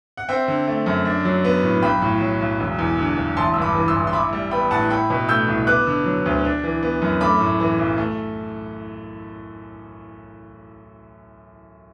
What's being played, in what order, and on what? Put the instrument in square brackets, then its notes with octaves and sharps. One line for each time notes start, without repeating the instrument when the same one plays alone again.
[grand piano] F#5
C4 E5 G5
D3
A3
F#2
D4
F#3
B3
A2
B1 G5 B5
A2
F#3
B1
E1
E2
D3
E1
A1 A5 C6
G2 E6
B5 D6
E3
C6 E6
A1
C6
E4 B5 D6
G3
B3 G5 B5
A2 F#5 A5
E4 G5 B5
B2
A3 E6 G6
C2
B3 D6 F#6
D3
F#3
D2
D4
E3
B3
F#2
A3 B5 D6
A2
E3
B1
A3